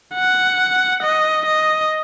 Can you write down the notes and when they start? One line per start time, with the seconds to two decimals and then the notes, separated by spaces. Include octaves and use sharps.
0.15 F#5
1.03 D#5
1.46 D#5